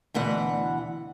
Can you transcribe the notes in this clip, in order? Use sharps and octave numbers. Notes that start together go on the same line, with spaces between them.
D2 B2 E3 F#5